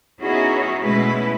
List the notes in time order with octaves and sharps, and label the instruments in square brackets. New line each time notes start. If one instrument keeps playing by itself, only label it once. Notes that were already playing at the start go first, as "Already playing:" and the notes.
[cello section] B3 C#4 D#4 E4 F#4 G#4
B2 G#3 A3 C#4 E4 B4